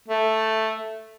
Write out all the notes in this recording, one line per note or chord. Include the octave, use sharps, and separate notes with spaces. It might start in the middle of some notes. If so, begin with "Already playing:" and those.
A3